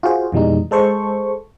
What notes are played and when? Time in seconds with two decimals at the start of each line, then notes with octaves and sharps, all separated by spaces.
0.03 F4 F#4 G#4 C5
0.32 F2 B2 E3 G3 G#3 D#4
0.71 G#3 A4 C5 C#6